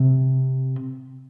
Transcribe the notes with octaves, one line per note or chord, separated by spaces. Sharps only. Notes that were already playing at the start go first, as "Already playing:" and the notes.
Already playing: C3